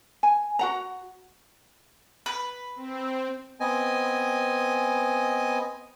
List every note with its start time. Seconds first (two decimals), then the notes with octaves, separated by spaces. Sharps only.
0.23 G#5
0.59 F#4 F#5 A#5
2.26 B4
2.76 C4
3.60 B3 C4 D#5 G#5